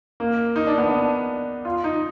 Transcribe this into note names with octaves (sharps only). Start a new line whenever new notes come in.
A#3
D#4
D4
B3
D4
F4
D#4